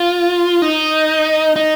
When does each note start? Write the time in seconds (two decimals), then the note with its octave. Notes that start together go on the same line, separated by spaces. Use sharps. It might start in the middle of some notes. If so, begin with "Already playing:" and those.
Already playing: F4
0.62 D#4
1.56 D#4